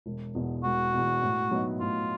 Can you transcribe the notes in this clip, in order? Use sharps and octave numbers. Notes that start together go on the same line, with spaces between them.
E1
E2 B2
E1 F#4
E2 B2
A2
F#3 B3 D#4
A2 F4